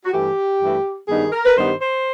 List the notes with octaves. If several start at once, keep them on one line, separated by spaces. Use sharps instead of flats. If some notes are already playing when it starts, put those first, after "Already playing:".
F#4
G2 E3 A3 G4
G2 E3 A3
G2 D#3 G3 B3 D#4 G#4
A#4
B4
G2 D#3 G3 B3 D#4 C5
C5